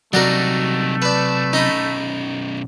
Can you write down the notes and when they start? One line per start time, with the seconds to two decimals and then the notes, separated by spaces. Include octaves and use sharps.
0.13 C3 F#3 G3 A3 D4 D#4 F#4 A#4
1.02 B1 B4 D5 A5
1.53 B1 C#4 D#4 D#5 B5